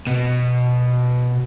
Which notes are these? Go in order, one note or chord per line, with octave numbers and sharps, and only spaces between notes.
B2